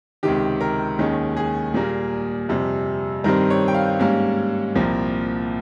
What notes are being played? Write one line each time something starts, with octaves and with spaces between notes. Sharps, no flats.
C#2 C3 D#3 G4
A#4
D#2 D#3 G#3 C#4
G#4
A#2 G3 A#3
F2 C3 G3
G2 D#3 G3 C4 A#4
C#5
G5
F5
G#2 G3 A#3 C#4 F5
C2 A#2 F3 A#3